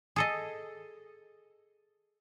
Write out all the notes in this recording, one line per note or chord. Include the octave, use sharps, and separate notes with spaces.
G#4 A4 D#5